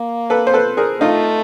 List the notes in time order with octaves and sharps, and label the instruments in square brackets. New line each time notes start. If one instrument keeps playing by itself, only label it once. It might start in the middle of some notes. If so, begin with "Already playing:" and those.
Already playing: [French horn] A#3
[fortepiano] A4 B4
C5
A4 B4
G#4 A#4
[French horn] A3 [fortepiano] D#4 F4